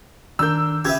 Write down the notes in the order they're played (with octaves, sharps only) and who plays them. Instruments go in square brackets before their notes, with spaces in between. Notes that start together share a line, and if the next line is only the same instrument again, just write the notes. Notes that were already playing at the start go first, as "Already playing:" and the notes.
[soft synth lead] D#3 [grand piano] D4 A#4 G6 [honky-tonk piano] E6
[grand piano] C#3 G#6 [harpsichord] G4 B4 E5